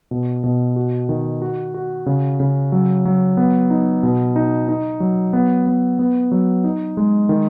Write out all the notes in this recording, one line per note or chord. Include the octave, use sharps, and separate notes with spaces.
B2
B2
F#4
D#3
F#4
F#4
C#3
C#3
F#3
F#3
B3
D#4
B2
D#4
D#4
F#3
B3
B3
B3
F#3
D#4
G#3
D#3